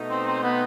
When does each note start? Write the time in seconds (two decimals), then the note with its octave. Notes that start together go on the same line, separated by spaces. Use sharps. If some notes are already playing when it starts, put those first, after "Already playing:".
Already playing: B2 A3 D#4
0.10 C4
0.27 C4
0.43 B3